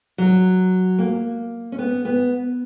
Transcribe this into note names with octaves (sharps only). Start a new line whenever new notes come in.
F#3
A#3
C#4
B3
B3